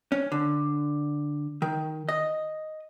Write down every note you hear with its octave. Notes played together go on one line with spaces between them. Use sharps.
C#4
D3
D#3
D#5